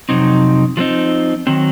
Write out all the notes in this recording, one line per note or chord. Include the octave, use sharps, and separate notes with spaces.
F2 C3 F#3 C4 D#4
F3 G#3 C4 D#4
D#3 F#3 C4